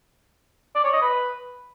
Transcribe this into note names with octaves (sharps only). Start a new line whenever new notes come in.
D5
C#5
D#5
B4